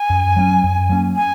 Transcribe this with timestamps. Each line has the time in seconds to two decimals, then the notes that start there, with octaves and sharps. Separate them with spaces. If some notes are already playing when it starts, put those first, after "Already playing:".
Already playing: G#5
0.10 F#2
0.36 F#3 A#3 C#4
0.64 F#2
0.90 F#3 A#3 C#4
1.16 G#5